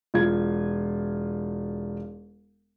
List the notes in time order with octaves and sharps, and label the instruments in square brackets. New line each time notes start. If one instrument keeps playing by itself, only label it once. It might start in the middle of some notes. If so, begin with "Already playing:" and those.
[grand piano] E1 F4 G#6